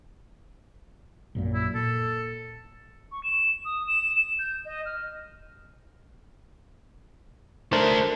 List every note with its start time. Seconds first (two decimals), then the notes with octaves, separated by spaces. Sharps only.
1.35 A#1 F#2 A#2
1.54 E4
1.75 A#2 A4
3.12 C#6
3.24 E7
3.65 D#6
3.88 E7
4.15 E7
4.39 G6
4.65 D#5
4.86 F6
7.73 A3 D4 A#4 C5 A5